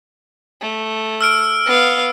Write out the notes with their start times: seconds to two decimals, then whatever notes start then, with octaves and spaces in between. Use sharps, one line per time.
0.61 A3
1.21 E6 F6 D7
1.66 B3 F5